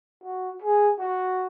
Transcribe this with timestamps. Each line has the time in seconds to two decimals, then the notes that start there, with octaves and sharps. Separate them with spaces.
0.24 F#4
0.62 G#4
0.99 F#4